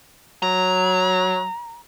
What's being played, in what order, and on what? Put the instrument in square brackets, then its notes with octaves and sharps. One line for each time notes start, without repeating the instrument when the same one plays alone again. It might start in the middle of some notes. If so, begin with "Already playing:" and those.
[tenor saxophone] F#3 [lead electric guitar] A#5